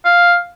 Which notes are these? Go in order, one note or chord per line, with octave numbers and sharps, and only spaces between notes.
F5